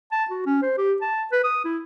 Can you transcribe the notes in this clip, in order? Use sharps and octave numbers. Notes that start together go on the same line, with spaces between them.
A5
F#4
C#4
C5
G4
A5
B4
D#6
E4